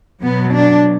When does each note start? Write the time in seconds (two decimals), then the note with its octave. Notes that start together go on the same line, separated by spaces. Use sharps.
0.22 B2 F#3 B3
0.53 D4